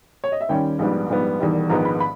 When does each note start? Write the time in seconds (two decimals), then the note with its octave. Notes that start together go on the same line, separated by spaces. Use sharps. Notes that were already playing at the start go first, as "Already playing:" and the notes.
0.24 C#5
0.32 D#5
0.41 E5
0.49 D#2 D#3 G3 C#4 G5
0.79 A#1 G#2 G3 B3
1.09 A#1 G#2 G3 B3
1.40 E1 E2 D#3 G3
1.70 A#1 G#2 D#3 G#3 B3 A#5
1.85 B5
2.00 B5